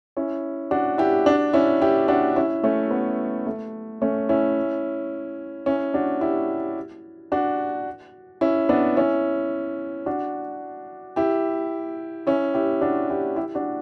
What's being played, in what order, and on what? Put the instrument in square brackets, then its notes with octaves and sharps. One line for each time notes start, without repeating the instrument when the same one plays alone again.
[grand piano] C#4 E4
D4 F#4
E4 G4
D4 F#4
C#4 E4
E4 G4
D4 F#4
C#4 E4
A3 C#4
B3
A3
A3 C#4
C#4 E4
C#4 E4
D4 F#4
E4 G4
D4 F#4
C#4 E4
B3 D4
C#4 E4
D4 F#4
E4 G4
C#4 E4
E4 G4
D4 F#4
E4 G4
E4 G4
D4 F#4